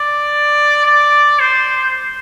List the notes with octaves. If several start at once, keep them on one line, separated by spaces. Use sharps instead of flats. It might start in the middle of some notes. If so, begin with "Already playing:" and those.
Already playing: D5
D5
C5